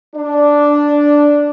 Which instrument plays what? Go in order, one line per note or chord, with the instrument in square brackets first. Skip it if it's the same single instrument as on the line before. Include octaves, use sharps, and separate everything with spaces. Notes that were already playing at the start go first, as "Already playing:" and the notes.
[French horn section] D4